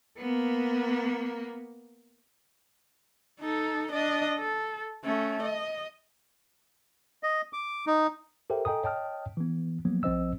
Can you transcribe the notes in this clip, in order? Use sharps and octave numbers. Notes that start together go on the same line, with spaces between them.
A#3 B3
D#4 A4
D4 D#5
A4
A3 C#4
D#5
D#5
D6
D#4
G4 A4 A#4 C5 E5 G5
A4 D#5 G5 G#5 A#5 D#6
C#5 D#5 G5 A5 D#6 F6
E3 B3
F3 F#3 A#3 B3
A#1 F3 C4 C5 D#5 E6